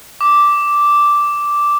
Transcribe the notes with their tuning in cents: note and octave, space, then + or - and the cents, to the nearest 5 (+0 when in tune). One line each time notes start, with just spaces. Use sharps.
D6 -5